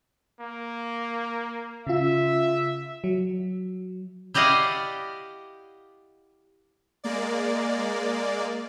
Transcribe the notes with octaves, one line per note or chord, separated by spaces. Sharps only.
A#3
C#3 F4 E5
F#3
E4 G4 D5 D#5 F5 F#5
G#3 A#3 D5